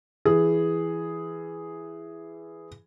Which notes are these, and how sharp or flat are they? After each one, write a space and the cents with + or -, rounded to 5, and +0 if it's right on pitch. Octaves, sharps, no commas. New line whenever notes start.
E3 +10 G#4 +0